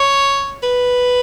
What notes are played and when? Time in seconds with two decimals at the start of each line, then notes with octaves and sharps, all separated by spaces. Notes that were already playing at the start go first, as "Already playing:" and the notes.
Already playing: C#5
0.63 B4